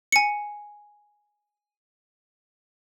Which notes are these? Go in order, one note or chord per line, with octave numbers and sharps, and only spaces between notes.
G#5 C#7